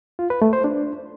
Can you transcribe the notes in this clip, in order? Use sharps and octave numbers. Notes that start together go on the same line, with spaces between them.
F4
B4
A3
C5
D4